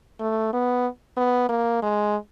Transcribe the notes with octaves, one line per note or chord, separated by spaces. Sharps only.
A3
B3
B3
A#3
G#3